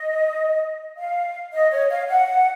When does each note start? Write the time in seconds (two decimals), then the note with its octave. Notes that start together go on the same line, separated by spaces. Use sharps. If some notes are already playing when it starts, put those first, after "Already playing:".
Already playing: D#5
0.98 F5
1.54 D#5
1.72 C#5
1.90 F5
2.09 F#5